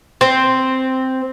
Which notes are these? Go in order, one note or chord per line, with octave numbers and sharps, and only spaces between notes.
C4